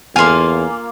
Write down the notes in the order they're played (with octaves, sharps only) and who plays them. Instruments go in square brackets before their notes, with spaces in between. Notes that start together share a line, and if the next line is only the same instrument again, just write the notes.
[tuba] E2 [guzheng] A#3 F4 F5 [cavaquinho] G#5 C6